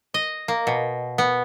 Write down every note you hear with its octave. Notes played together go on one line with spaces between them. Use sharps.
D#5
A#3
B2
B3